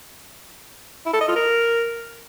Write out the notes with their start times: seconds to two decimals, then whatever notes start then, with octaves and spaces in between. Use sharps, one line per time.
1.06 E4
1.13 A4
1.21 D#5
1.28 F4
1.36 A#4